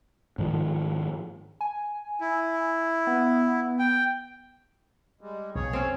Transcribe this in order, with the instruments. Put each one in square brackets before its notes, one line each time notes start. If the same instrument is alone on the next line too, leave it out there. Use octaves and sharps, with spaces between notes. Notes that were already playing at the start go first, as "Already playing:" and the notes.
[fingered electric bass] G#2 D#3 F3
[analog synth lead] G#5
[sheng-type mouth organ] E4
[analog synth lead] B3
[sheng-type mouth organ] G5
[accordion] G3 G#3
[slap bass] B1 F2 [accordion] G#4 C#5
[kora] C4 C#4